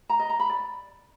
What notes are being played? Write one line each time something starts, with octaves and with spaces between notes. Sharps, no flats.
A#5
D#5
A#5
B5
D5